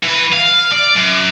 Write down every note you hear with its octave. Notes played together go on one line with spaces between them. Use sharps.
E3 B4
F5
D5
F#2